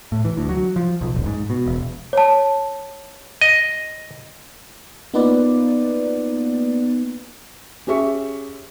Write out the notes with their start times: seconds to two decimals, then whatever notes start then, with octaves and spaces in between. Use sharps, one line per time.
0.12 A2
0.25 E3
0.37 D2
0.49 F#3
0.76 F3
1.01 B1
1.14 D#1
1.26 G#2
1.50 B2
1.66 E1
2.13 C#5 A5
3.41 D#5
5.14 A#3 B3 D#4 F4 B4 D5
7.87 C#4 G4 G#4 E5 C#6